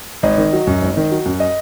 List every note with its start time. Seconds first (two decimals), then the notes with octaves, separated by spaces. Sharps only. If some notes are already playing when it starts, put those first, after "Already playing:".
0.23 G#1 D#5
0.38 D#3
0.53 F#3
0.67 F#2
0.82 G#1
0.97 D#3
1.11 F#3
1.26 F#2
1.40 D#5